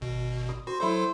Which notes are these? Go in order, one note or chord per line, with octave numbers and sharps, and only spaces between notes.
G#1 B2
D#6
F#4 C5
F#3 E4 A4 C5 C6